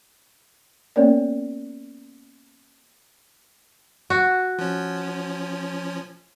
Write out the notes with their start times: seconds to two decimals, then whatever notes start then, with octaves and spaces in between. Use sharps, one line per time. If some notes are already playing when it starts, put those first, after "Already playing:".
0.96 A#3 B3 C#4 A#4 C#5 D5
4.10 F#4
4.59 F3 C#4